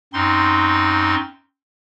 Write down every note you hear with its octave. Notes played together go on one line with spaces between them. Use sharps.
F#2 C4 D#4 C6